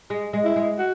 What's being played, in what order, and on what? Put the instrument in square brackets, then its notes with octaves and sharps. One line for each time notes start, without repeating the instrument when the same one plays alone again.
[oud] G#3
G#3
[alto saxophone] E4
[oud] G#3
[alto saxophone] F#4